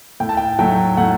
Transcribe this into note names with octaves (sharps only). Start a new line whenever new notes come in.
A2 G5
A5
G5
F#3 A3 G5
A2 F#5